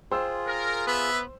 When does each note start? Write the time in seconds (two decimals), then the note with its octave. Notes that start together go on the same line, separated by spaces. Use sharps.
0.12 F4 G#4 C5 G5 E6
0.47 A#4
0.87 B3 B4 E5